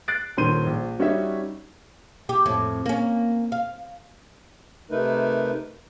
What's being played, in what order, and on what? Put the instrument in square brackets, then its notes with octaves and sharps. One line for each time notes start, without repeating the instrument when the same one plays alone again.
[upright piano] F#6 A6 C7 D7
D#1 D#3 C#4 C6 G6 D#7
A#1
G3 C#4 D#4 F#4 C#5 E5
[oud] G4
F2 A2
A#3 C#4
F5
[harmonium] C3 A3 D#4 A#4 B4